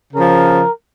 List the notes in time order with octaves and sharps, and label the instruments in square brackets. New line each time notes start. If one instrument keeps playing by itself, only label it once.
[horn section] C#3 F3 A#4